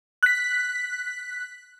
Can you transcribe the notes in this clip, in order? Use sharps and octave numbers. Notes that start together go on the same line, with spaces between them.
F#6 B6